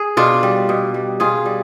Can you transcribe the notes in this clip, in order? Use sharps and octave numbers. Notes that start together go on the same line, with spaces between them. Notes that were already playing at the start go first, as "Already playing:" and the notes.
Already playing: G#4
B2 D4 F4
G3
B2
G3
B2 F4 G#4
G3